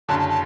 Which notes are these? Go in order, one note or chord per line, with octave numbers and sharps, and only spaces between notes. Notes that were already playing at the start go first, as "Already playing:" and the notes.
F#1 F#2 D3 A5
A5
A5